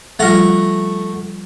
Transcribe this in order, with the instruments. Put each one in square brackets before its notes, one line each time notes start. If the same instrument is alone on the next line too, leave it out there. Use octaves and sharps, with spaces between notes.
[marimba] F3 G3 F4 [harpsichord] A3 F#5 A#5